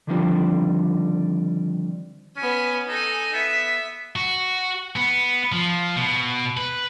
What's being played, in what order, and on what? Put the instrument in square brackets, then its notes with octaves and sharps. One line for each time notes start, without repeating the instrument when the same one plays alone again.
[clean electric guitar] D3 D#3 F3 G3 C4 D4
[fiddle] B3 G#5 [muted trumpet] C#4
[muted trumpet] D#4 [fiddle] A4 G#5
[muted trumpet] B3 [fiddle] E5
[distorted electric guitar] F#4
B3
F3
B2
B4